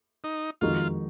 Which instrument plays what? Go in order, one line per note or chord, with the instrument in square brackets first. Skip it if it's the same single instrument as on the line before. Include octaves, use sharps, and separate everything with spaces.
[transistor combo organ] D#4
[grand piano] F2 D#3 G#3 D#4 F#4 [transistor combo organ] F4